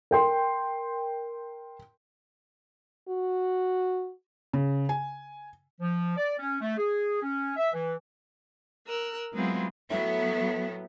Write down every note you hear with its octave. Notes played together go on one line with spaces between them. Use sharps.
A#4 G5 C6
F#4
C#3
G#5
F3
D5
C#4
A3
G#4
C#4
E5
E3
A#4 E6 F#6
F#3 G#3 B3 C4 E4 F4
A2 F#3 B3 E5